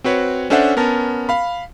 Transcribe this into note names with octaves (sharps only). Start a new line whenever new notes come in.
C4 F#4 B4 C#5
C#4 D4 A4 C5 E5 F#5
B3 C#4 A#4 A5
F5 B5